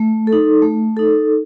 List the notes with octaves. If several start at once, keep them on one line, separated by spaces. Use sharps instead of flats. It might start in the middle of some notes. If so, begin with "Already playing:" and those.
Already playing: A3
A4
D#4
A3
D#4 A4